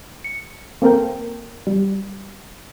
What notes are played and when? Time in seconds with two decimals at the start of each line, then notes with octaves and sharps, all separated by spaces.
0.24 C#7
0.82 A#3 C4 A4 A#4 G5
1.67 G3